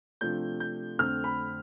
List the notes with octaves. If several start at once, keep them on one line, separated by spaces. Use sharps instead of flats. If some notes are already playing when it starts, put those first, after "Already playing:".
C3 F3 A3 D4 G6
G6
F2 D3 A3 C4 F6
B5